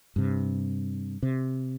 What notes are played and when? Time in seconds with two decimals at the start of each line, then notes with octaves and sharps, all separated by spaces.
0.16 G2 C3
1.23 C3